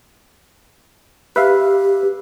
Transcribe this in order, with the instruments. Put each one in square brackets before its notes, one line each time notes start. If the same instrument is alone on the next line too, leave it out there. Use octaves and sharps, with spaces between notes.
[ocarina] G4 [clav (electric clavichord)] B4 E5 F5